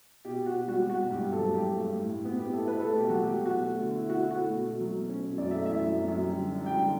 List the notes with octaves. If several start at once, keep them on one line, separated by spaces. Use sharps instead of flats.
B2 G4
B2
F#4
B2
G3 F#4
G3
F#4
B2
G2 G4
G2
A4
F#3
G2 G4
A3
G2
A2
A2
B3
B3 G4
E4 A4
E4 B4
A3 A4
B2 G4
F#3 F#4
F#3 G4
B2
F#4
B2
A3
D3
E4
E4 F#4
E4
F#4
A3
B2
B2
F#3
B2
C#4
B2
F#2 D5
A3 E5
E3 E5
F#2
F#2
F#2
G3
D3
D4
G3 G5
D3